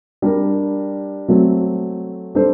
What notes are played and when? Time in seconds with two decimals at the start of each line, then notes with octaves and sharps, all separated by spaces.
0.22 G3 D4 G4 A#4
1.28 F#3 A3 C4
2.35 G3 D4 A4 C5